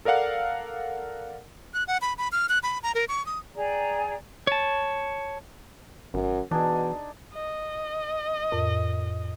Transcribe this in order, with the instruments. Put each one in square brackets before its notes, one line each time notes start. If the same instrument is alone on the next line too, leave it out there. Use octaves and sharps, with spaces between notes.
[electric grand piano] A4 A#4 D5 F5 F#5
[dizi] F#6
F#5
B5
B5
F6
F#6
B5
A#5
A#4
C#6
D#6
[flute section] G#4 D5 G5 A#5
[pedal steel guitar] C#5 A5
[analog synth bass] G#1 [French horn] F#2
[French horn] B2 [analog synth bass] E3 [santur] D4 D#4 G#4
[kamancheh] D#5
[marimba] F2 A2 A#4